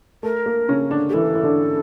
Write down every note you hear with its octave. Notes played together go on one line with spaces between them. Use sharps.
A3 A#4
A#3
C#3 C#4
D3 D4
G4
E3 E4 A4
E4
D3 D4